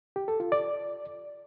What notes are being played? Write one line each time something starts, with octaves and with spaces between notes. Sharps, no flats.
G4
A4
F4
D5